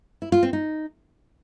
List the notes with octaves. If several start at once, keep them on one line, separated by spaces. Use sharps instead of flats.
E4
F4
C4
D#4